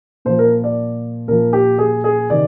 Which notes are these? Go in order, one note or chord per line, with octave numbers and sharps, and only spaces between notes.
A#2 F3 C5
A#4
D5
A#2 F3 A#4
G4
G#4
G#4
C3 D#3 D5